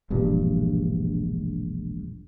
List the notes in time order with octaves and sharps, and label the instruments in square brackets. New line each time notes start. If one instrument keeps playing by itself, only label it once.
[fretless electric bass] E1 A#1 G2